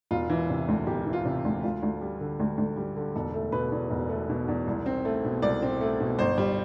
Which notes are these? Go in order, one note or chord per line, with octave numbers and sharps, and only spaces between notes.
E1 F4
E3
C3
D2
E1 G4
E3
F4
C3
D2
D2 F4
D2
G3
D3
D2
D2
G3
D3
E1 A4
A3
B2 B4
E2
E1
A3
B2
E2
C2
C4
A3
B2
C2 D5
C4
A3
B2
G1 C5
G3